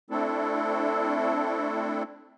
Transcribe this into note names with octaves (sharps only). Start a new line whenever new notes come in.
A3 C4 D4 E4 A4